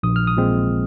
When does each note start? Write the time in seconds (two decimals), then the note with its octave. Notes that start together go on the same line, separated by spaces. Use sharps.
0.03 A#1 D#6
0.16 F6
0.27 D#6
0.37 A#2 G#3 C4